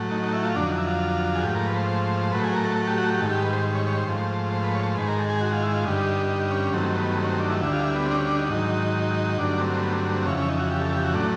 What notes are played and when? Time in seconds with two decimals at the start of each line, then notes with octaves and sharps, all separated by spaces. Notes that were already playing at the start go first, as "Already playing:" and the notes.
Already playing: A2 F#3 A3
0.11 D#4
0.22 D#4
0.33 E4
0.44 F4
0.55 F2 D3 F#3 D4
0.66 D#4
0.77 E4
0.88 F4
1.35 G#4
1.43 G#2 F3 A3 G4
1.55 A#4
1.66 B4
1.76 C5
2.32 A2 F#3 A3 B4
2.43 G#4
2.54 A#4
2.65 A4
2.76 A4
2.87 G4
2.98 F#4
3.09 G4
3.20 G#2 D#3 G3 A4
3.31 G4
3.42 B4
3.53 C5
3.75 C#5
3.86 C#5
3.97 C5
4.08 G#2 F3 A3
4.53 C5
4.63 B4
4.75 C#5
4.85 C5
4.96 G#2 D#3 G#3 B4
5.08 A#4
5.18 A4
5.30 G#4
5.41 F#4
5.52 F4
5.63 E4
5.74 F4
5.85 G2 D3 G3 D#4
6.29 D#4
6.51 C#4
6.73 G2 D#3 F#3 A3 C4
6.95 B3
7.17 C4
7.24 C#4
7.28 C4
7.40 D4
7.50 E4
7.61 D2 D3 G3 E4
7.72 F4
7.83 E4
7.95 B3
8.05 C4
8.11 D4
8.16 C#4
8.28 D4
8.39 D#4
8.49 G#2 D#3 F#3
9.38 G2 D3 F#3 A3 D4
9.60 C4
9.82 B3
9.93 C4
10.15 C4
10.26 F2 C#3 E3 C#4
10.37 C#4
10.49 D#4
10.59 F#4
10.71 G4
10.81 A4
10.92 G4
11.03 F#4
11.14 A2 F#3 A3 D4